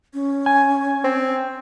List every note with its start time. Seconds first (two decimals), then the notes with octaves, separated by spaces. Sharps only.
0.14 C#4
0.46 G#5
1.04 C4